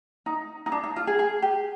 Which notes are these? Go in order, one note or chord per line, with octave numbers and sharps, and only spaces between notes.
D#4
D#4
D4
D#4
F4
G#4
G#4
G4